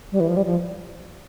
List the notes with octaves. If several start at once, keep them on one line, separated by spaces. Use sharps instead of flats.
G3
E3
F3
G3
F3